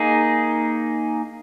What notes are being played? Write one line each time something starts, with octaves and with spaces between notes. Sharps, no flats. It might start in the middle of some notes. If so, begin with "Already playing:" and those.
Already playing: A#3 D#4 G#4